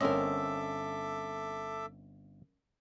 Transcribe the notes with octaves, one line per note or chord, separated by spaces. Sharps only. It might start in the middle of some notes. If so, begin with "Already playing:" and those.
G1 C4 C#4 A4 A#4 D#5 E5 D6